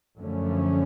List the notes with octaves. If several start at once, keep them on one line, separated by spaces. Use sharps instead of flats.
F#2 D3 F3 A3 C#4